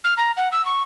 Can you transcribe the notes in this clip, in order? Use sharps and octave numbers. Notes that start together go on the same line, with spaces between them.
F6
A#5
F#5
E6
C#6